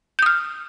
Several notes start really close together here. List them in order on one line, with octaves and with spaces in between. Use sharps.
G6 D#6 F6